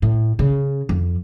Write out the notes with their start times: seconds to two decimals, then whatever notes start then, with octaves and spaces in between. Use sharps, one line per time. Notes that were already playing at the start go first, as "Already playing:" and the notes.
0.02 A2
0.39 C#3
0.89 F2